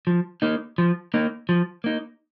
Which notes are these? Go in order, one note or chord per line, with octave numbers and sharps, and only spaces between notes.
F3
A#3 D#4
F3
A#3 D#4
F3
A#3 D#4